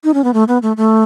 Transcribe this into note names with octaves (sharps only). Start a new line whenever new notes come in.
D#4
C#4
B3
A3
B3
A3
A3